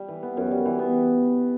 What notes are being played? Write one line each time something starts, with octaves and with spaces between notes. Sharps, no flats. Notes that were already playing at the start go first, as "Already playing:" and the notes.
Already playing: G3
E3
B3
F#2
G3
E3
B3